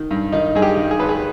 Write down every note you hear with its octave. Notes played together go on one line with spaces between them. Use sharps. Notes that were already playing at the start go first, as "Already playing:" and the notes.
Already playing: D#3
G2
D#3 D#4
G2 G#4
G4
D#3
G#4
G#1 B4
G#4